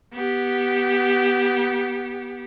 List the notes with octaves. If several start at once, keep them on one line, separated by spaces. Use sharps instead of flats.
B3 G4